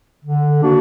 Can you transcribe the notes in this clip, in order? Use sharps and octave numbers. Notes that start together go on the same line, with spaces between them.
D3
A#3 D4 F#4